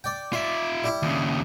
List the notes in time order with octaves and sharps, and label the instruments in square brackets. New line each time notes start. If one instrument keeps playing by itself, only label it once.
[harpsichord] D5 G5
[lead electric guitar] F4 E5 [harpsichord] D5
[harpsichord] G3 E4
[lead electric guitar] D#2 C#3